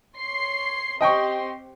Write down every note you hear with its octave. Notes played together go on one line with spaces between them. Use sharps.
C#5 C6 C7
C4 G4 D#5 G5 C6 C#6